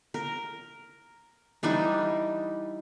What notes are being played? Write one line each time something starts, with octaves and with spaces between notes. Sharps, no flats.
A#4
E3 G3 D4 D#4